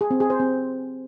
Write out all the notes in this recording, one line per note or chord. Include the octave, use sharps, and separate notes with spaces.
G#4
C4
G#4
C5
C4